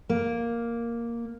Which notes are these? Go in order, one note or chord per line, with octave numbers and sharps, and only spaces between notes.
A#3